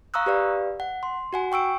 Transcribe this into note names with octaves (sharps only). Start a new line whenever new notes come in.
F5 A#5 C#6 D#6 E6 F#6
G4 B4 D5 F5
F#5
C6
F#4 F#5 G#5
G5 C#6 E6 D7